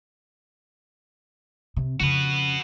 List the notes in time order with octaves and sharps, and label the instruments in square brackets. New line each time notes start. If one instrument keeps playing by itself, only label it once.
[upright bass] C3
[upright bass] F2 C#3 [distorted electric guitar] F#4 B4